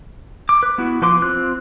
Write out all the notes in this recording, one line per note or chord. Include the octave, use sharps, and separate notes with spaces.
D6
B4
B3 E4 F#4
F3 B4 C6 D6
C4 F4 F#6